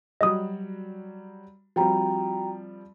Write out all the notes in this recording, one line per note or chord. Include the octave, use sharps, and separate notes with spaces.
F#3 G3 F#4 D#5 D#6
F3 G3 C4 F#4 G5 A#5